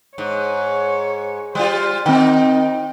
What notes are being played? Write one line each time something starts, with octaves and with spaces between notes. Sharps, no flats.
G#2 C#5
G3 F4 C5
D#3 C4 D#4 G5